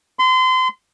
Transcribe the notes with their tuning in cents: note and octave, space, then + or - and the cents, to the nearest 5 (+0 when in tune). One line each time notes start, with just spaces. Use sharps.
C6 -30